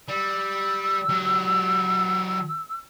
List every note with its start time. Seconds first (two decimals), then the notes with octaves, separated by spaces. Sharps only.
0.08 G3 E6
1.09 F#3 G4